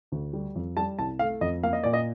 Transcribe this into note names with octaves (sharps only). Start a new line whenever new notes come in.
D2
G3
F2
G3 A5
C2 A5
A3 F5
F2 D#5
A#3 F5
D#5
A#2 D5
D#5